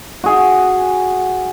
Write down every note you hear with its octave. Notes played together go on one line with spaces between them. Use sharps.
F#4 G#4